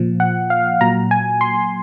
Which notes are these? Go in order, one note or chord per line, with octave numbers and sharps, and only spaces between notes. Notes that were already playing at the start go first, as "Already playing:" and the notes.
Already playing: A#2 F3
F#5
F5
A#2 F#3 A#5
G#5
C6